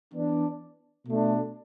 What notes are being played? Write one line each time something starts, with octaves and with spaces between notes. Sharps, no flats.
E3 B3 D4
B2 A3 D4